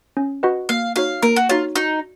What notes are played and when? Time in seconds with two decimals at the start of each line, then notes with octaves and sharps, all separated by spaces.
0.17 C#4
0.43 F#4 B4 D#5 F#5
0.69 A#3 F5
0.96 D#4 F#4 C#5 F5
1.23 A#3 A#4
1.36 F#4
1.49 D#4 F4 F#4 C#5
1.76 D#4 F#4